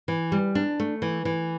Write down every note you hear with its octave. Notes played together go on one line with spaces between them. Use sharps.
E3
G3
D4
A3
E3
E3